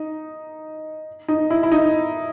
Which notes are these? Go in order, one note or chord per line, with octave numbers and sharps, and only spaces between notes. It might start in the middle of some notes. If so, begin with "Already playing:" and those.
Already playing: D#4
D#4
E4
E4
D#4